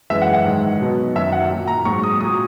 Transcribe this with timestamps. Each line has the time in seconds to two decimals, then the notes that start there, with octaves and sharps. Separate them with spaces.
0.10 F#2 E3 G#3 E5
0.22 F#5
0.33 F#5
0.45 G#2 D#3 G#3
0.80 B2 F#3
1.16 F#2 D#3 F#3 E5
1.32 F#5
1.50 A#2 F#3
1.68 A#5
1.85 G#2 F#3 C#6
2.03 D#6
2.21 A#2 D#6
2.25 F#3